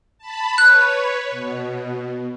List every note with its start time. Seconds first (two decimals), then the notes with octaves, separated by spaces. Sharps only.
0.18 A5 B5
0.58 B4 C#5 F#6
1.31 B2